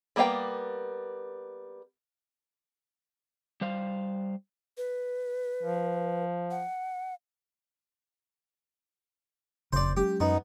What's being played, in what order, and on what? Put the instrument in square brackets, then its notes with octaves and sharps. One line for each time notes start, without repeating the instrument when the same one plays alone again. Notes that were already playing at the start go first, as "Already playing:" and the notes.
[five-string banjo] G3 A#3 B3 F5 G5
[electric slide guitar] G3 C5 F5
[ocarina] B4
[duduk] F3
[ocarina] F#5
[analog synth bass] F#1 [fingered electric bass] F2 C#3 [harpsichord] C5 D5
[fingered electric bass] F#3 G#3 C#4 [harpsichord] G4
[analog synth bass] F#2 [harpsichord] B3 [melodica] D#4